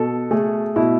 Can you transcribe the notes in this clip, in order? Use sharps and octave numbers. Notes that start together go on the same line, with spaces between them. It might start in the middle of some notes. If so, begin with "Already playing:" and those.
Already playing: B2 A4
A3 G#4
B2 E4